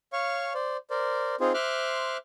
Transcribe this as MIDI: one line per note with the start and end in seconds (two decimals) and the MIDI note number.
0.13 0.53 73
0.13 0.53 77
0.13 0.53 85
0.54 0.77 72
0.54 0.77 74
0.90 1.36 70
0.90 1.36 72
0.90 1.36 74
1.40 1.52 60
1.40 1.52 63
1.40 1.52 65
1.40 1.52 68
1.40 1.52 72
1.54 2.17 72
1.54 2.17 76
1.54 2.17 84
1.54 2.17 86
1.54 2.17 89
1.54 2.17 90